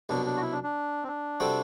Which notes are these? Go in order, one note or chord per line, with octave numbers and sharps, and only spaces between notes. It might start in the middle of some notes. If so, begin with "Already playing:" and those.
C2 B2 F#3 D4
D4
F#4
E4
D4
D4
C4
D4
C3 G3 C4 F#4 A4